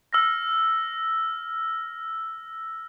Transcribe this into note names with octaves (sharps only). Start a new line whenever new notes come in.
E6 F6 A#6